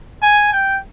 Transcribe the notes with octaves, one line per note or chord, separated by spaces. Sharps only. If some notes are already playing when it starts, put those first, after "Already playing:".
G#5
G5